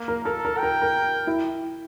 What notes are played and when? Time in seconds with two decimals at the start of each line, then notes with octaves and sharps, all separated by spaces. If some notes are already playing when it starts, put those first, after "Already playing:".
Already playing: A#3
0.08 A#4
0.24 A4 A#4
0.45 A#4
0.58 A#4 G5
0.82 A#4
1.27 E4